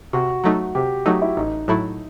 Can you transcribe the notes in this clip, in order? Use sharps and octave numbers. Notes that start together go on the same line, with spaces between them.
C3 F#4
F#3 A3 D#4
C3 G4
F#3 A3 D#4 F#4
E4
A1 D#4
A2 F#3 A3 E4